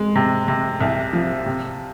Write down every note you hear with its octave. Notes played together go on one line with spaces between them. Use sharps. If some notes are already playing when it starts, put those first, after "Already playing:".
Already playing: G#3
C3
C3
C2
F3
C3